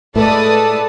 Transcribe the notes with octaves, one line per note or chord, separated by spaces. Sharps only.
A2 G#3 A3 A4 B4 D5 D#6